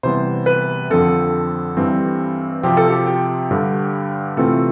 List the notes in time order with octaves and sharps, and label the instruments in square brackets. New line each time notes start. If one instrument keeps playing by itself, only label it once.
[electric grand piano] C3 E3 G3 B3 [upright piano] C5
[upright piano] B4
[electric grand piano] F2 D3 F3 C4 [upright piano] A4
[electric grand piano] G2 E3 G3 C4
[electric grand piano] C3 F3 C4 [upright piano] G4
[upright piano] A4
G4
G4
[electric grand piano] G2 D3 G3
[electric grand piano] C3 E3 A3 C4 F4 [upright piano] A4